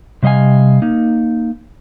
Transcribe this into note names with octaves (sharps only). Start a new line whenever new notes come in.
C3 G3 D#5 F5 G#5
A#3 D#4